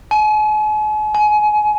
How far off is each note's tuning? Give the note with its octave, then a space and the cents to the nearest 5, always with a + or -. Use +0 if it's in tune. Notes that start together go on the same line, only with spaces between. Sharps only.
G#5 +45
G#5 +25